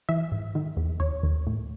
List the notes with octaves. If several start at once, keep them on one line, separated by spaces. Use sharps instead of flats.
E3 E5
G#2
D#3
E2
D#2 C#5
D#2
A2